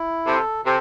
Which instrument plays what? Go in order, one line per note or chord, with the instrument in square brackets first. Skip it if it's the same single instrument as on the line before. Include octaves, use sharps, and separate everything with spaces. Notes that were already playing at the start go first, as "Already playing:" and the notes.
Already playing: [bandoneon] E4
[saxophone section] C3 [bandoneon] A4
[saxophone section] C3 [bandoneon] A4